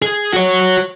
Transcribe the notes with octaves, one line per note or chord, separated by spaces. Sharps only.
G#4
F#4 C#5